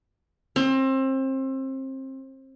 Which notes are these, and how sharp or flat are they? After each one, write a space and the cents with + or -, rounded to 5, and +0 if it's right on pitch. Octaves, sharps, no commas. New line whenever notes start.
C4 +30